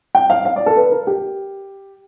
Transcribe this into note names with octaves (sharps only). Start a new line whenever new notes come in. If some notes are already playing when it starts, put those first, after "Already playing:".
G5
F5
F5
D5
A4
B4
A#4
G4